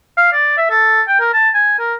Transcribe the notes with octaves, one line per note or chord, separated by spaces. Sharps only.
F5
D5
E5
A4
G5
A#4
A5
G#5
A#4